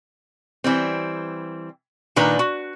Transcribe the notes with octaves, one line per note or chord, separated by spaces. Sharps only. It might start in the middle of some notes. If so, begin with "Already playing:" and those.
E3 G3 C4
A#2 D#3 D4 B4 A#5
F#4